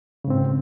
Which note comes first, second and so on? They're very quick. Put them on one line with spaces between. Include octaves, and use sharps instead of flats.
C#3 G#2 C4